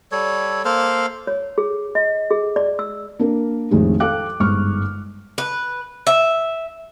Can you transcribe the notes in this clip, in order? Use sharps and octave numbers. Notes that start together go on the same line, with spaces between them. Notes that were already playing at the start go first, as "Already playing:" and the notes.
G3 A4 C#5
A#3 A4 C5 F5
C#5
G#4
D#5
G#4
D5
E6
A#3 D4 A#4
A1 F2 D#3 G#3
A4 F5 G5 D6 F#6
G1 G#2 C#6 F6
B4
E5